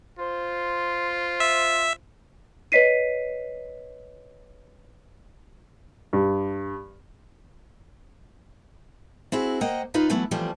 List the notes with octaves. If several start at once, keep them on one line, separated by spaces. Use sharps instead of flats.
F4 C5
E5
B4 C#5 D#5 B6 C7 D#7
G2
C4 E4 F#4 G#4
A#3 C5 D#5 F#5 G5
D#2 D#4 F4 B4 F5
E3 F#3 A3 B3 E4
E3 F3 G3 A3 C4